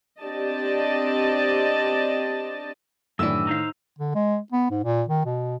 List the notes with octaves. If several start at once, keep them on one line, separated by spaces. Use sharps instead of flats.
C4 D4 G4 D5 D#5 A5
F#2 A2 D#3 E3 A3 D4 E6
D#4 C5 F5
D3
G#3
B3
G#2
A#2
D#3
B2